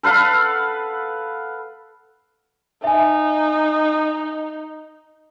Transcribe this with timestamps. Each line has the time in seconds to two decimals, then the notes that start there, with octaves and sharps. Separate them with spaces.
0.03 A4 B4 F5 F#5
2.84 D#4 E5 G#5